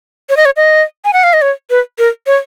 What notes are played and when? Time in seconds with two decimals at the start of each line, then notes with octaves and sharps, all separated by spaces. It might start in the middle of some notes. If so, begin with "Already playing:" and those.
0.30 C#5
0.37 D#5
0.45 C#5
0.57 D#5
1.05 G#5
1.13 F#5
1.24 F5
1.33 D#5
1.42 C#5
1.70 B4
1.99 A#4
2.27 C#5